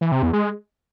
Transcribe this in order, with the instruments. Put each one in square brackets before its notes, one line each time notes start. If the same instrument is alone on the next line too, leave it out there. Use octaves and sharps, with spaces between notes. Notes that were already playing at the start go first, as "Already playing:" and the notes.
[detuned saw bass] E3
C3
E2
G#3